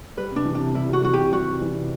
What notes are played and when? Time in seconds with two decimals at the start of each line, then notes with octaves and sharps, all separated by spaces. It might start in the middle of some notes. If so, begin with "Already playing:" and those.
0.17 G3 B4
0.31 C3 D4
0.45 E3
0.55 C3 D4
0.74 G3 E4
0.89 C3 F#4
1.03 E3 F#4
1.14 C3 G4
1.31 G3 F#4
1.47 C3
1.61 E3
1.75 C3